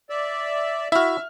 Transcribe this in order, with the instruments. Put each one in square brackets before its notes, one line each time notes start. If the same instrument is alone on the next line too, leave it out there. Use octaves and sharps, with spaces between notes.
[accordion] D5 E5
[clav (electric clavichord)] E4 F#4 [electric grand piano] E5 F6